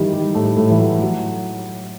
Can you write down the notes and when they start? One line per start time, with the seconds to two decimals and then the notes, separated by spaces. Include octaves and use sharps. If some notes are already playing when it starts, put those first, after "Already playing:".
Already playing: D#3 E3 G3 D#4 E4 G4
0.12 G3 G4
0.34 A2 A3
0.57 A2 A3
0.70 E3
0.79 F#3
1.01 F#3